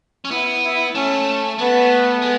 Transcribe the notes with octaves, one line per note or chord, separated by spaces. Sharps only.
C#4
B3 E4
E4
A3 C#4
A3 B3
G#3